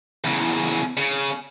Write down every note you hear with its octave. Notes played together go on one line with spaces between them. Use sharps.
E2 C#3
C#3